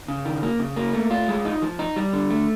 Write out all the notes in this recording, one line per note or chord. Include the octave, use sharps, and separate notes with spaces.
C#3
D#3
A#3
C#3
A#3
A3
F4
G#3
D#4
F3
D#4
G3
D3
A3